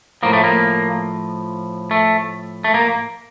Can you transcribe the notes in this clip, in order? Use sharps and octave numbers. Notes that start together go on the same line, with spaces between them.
A2 F3 A#3
A3
A#3
A3
A3
A#3